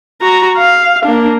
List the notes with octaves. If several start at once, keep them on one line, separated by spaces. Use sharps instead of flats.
F#4 A#5
F5
A#3 D4